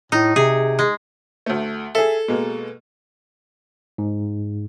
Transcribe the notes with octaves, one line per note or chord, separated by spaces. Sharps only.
A2 D#4
C3 G#4
G#3
D2 A3
G#4 A4 E5
B2 G#3 A#3
G#2